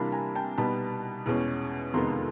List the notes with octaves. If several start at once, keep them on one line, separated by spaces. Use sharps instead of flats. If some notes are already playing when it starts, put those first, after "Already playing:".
Already playing: C3 E3 G3 A#3 D4 A5 B5
G#5 A#5
G5 A5
B2 G3 B3 D#4 A5 B5
E2 B2 G#3 C#4
F2 C3 D#3 G#3 B3 A#5 C6